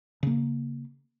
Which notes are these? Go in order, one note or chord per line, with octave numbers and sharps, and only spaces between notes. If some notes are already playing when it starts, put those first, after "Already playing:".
C#3 A#3